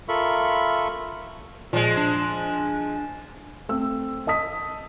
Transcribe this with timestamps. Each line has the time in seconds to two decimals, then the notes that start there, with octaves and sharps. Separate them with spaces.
0.08 F4 A4 A#4 E5 B5 C#6
1.73 A#2 F3 G#3
1.97 D4
3.69 A3 C4 E6
4.27 D#5 A5 D#6 B6